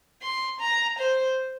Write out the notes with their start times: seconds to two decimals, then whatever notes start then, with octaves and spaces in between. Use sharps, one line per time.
0.22 C6
0.60 A#5
0.99 C5